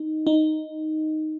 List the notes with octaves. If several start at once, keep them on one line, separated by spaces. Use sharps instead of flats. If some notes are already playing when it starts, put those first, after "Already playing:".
Already playing: D#4
D#4